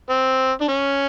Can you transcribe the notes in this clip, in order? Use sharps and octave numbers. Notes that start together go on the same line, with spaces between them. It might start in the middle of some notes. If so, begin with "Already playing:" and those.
C4
D4
C#4